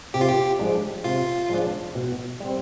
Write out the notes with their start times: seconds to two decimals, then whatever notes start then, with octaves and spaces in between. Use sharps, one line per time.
0.14 C3 G4
0.21 F4
0.29 G4
0.59 F3 G#3 D4
1.04 C3 F4
1.50 F3 G#3 D4
1.95 B2
2.40 G3 C4